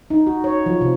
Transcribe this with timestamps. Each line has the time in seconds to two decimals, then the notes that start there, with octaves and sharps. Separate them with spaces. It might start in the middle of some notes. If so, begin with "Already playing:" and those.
0.10 D#4
0.27 F#4
0.44 C#5
0.66 F3
0.81 C3